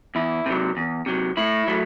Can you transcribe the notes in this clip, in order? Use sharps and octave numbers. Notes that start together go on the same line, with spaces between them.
E2 E4
C3 F#3
E2
C3 F#3
A2 E4
F#3 A3